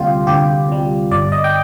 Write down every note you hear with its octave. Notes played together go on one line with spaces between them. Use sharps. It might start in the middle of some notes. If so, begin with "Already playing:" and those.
Already playing: D2 C3 G3 F4 G4
D2 G4
C3 G3
G1 D5
D#5
G5